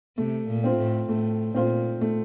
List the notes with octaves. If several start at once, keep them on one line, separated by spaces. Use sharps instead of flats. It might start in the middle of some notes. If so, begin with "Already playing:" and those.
C3 A3
A#2
C4 F4 C5
A2
A2 A3
A#2 C4 F4 C5
A3